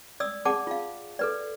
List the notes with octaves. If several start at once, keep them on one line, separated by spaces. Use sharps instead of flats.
D5 D#6 E6
G#4 D5 F#5 A5 D6
F4 F5
A4 B4 D5